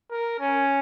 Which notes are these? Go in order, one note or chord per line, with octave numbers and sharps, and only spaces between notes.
A#4
C#4